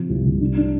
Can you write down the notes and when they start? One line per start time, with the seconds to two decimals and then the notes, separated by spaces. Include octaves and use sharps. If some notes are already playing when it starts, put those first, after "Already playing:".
Already playing: C3 F3
0.10 C2
0.25 C2
0.40 D4
0.57 D4